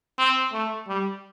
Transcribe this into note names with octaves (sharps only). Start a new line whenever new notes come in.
C4
A3
G3